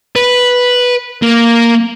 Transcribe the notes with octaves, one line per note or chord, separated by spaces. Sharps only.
B4
A#3